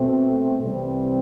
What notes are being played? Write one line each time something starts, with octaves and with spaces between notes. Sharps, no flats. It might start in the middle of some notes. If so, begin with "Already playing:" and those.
Already playing: B2 A3 C4
C2 C3 E3 G3 C4